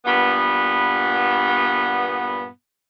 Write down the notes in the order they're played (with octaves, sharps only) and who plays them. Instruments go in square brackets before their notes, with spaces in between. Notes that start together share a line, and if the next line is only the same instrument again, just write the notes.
[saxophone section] G2 A#2 B3